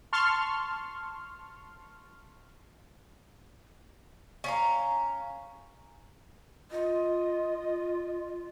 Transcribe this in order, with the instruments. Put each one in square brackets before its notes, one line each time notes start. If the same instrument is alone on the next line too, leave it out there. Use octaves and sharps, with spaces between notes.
[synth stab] A5 C6 C#6 F6
[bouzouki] C#4 F5 A#5
[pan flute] F4 [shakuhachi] D#5